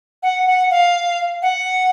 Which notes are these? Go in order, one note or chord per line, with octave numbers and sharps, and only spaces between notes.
F#5
F#5
F5
F#5